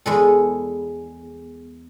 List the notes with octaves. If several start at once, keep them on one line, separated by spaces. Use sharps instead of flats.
E2 G#3 A4